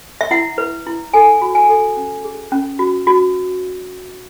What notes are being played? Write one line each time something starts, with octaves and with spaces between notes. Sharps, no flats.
E5
E4 F#5
B4
E4
A4 G#5
F#4
G#5
A4
C#4
G#4
C#4
F#4
F#4